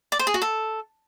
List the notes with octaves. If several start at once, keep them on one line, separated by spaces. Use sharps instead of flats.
D5
C5
G#4
F#4
A4